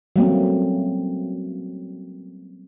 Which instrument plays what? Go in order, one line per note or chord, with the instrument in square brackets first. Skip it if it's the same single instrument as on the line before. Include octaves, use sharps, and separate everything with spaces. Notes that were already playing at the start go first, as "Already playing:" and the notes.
[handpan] F#3 G3 A3 A#3 C4 C#4